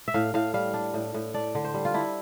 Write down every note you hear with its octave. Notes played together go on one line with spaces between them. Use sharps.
E5
A2 F5
A2 F5
G3 F5
D4
A2
A2
D4 D5
D3
C5
G3
F4
D4 E4